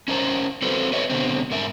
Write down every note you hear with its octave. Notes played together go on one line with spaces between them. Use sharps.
C#4 A#4 C5 A5
C4 F#4 A4 B4 C5
B4 C#5 D#5 E5
B2 D3 C4
G#2 A#4 E5